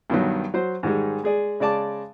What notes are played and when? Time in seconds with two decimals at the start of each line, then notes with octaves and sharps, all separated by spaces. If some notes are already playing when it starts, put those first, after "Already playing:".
0.10 G2 B2 D#3 F#3
0.54 F#3 C5
0.83 G#2 D#3 G3 G#3
1.24 G#3 G#4 D5
1.60 C#3 G#3 D5 A5 D6